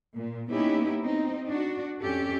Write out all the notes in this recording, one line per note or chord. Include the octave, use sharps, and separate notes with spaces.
A#2
A#3 B3 C#4 D#4 E4 G4
B3 C4 D#4
D4 F#4
F2 C#4 G4 A4